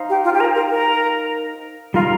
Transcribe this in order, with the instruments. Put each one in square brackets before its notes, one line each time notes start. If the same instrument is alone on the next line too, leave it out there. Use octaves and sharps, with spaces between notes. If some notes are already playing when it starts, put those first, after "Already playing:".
Already playing: [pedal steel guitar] D#4 C5 F5
[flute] G4
F4
G4
A#4
A#4
A#4
[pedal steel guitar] G3 D#4 A#4 F5 [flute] F4